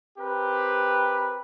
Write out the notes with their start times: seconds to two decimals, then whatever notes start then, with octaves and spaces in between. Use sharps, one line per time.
0.18 C4 G4 A#4 B4